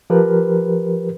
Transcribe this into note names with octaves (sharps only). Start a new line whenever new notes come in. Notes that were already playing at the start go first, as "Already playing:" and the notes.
F3 G4 A#4 B4